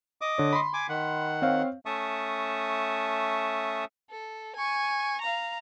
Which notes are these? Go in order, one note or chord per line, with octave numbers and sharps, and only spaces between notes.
D#5 D6 D#6
D3 C#5
B5 C6
G#5 D6
D#3 F#5
C4 C#5 F5
A3 C#4 E5 A5 C#6 D#6
A4
G#5 C#6
F5 A#5